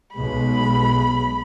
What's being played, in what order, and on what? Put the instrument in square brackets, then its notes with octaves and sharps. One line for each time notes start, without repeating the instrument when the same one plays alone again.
[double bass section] B1 B2 G#3 [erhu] B5